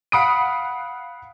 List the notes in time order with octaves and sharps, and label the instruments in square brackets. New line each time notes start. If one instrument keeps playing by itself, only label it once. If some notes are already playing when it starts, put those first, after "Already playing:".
[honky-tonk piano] F5 F#5 B5 D#6 B6 D7